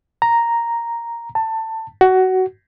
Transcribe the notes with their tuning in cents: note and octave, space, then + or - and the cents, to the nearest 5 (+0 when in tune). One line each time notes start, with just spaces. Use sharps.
A#5 +0
A5 +20
F#4 +15